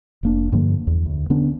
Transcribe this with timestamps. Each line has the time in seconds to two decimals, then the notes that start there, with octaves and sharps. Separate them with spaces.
0.23 F1 A#3 D4
0.52 G2 D3 F3 A#3
0.87 E2
1.06 D2
1.30 D3 B3 C#4 D4